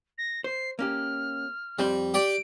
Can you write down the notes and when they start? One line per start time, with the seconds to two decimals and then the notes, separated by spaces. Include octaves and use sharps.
0.17 A#6
0.44 C5 C7
0.79 A#3 C#4 G4 F6
1.79 F2 G3 C4 C6
2.14 G4 D5 G5 D7